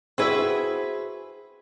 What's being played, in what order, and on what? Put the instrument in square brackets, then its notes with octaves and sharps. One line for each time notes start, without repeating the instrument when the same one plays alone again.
[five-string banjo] C4 E4 E5 [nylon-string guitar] F#4 G#4 B4